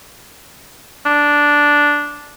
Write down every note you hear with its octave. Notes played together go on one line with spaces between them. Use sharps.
D4